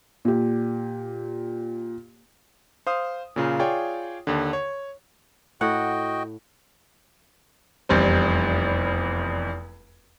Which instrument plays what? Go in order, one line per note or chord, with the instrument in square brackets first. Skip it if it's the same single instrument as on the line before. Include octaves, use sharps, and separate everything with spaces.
[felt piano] A#2 G4
[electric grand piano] C5 F5 D#6
A#2 C#3 F4 A#4
F4 G#4 C#5 D5 G5
D#2 D3
C#5
[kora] A2 F#5 [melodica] F#4 D#5 G5
[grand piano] F1 E2 G3 C4